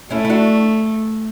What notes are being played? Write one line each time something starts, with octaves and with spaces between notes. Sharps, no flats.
A3 C#4 E4
E4
D4 F#4